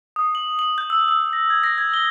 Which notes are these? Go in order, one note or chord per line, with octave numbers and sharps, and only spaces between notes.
D#6
F#7
F#7
G6
E6
E6
A#6
G#6
A#6
G#6
G7